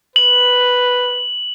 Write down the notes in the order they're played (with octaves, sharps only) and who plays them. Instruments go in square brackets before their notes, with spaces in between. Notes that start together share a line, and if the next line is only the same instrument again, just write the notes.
[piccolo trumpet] B4 [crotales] F#7